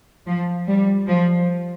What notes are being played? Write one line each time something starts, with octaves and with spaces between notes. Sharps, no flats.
F3
G3
F3